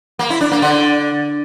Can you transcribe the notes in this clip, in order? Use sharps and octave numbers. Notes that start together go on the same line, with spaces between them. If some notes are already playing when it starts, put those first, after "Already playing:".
A#3
E4
D4
A#3
D3